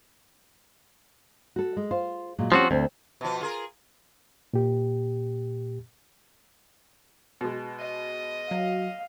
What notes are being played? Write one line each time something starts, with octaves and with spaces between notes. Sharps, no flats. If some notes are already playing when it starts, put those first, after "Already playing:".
F#4 A4
G#3
F4 C5
A#2 F#3 G#3
F3 C4 C#4 F#4 G4
D2 C4
B2 F3
F4 G#4 A#4
A#2 G4
B2 G#3
D#5
F#3 F5